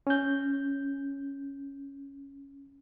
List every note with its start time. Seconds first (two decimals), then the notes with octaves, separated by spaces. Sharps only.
0.07 C#4 G6